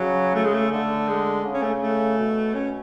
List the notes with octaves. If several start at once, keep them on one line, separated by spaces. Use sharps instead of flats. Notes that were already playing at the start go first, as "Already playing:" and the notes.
Already playing: C#3 F#3
A3
G#3
A3
D3 A3
G#3
C#3
C#4
A3
A3
B2
C#4